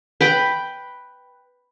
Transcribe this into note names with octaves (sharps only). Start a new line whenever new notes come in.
B4 G5 B5